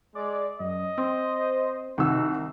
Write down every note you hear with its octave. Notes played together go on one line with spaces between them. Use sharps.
G#3 D5
F#2 D#5
C4 C5
C2 D#3 D#4 F#4 E6